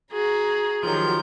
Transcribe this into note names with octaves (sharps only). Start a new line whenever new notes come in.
F#4 G#4 A#5
D#3 F3 F#3 F4 G4 A#4 G6